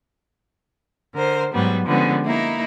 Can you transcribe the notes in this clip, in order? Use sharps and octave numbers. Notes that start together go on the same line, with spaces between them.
D3 A#4 C5
G#2 F#3 G3 B3
D3 F3 G3 G#3 B3 C#4
A#3 D#4 E4